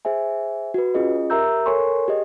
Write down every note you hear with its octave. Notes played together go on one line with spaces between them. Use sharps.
G#4 C5 E5 G#5
F#4 B4
C#4 F4 G#4 D#5
G4 A#4 E5 A#5 E6 G6
A4 A#4 C#5 G#5 C6 C#6
G4 G#4 D#5